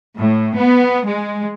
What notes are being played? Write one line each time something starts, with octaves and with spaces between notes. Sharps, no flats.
A2
B3
G#3